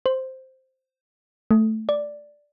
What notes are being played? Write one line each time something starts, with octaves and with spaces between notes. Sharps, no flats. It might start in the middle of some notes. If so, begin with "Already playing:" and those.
C5
A3
D5